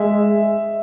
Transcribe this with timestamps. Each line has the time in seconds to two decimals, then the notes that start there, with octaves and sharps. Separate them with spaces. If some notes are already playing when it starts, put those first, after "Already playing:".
Already playing: G#3 E5